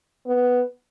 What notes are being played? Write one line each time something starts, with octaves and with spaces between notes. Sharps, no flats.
B3